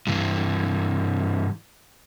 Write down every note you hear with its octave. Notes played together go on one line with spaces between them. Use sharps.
G2 E3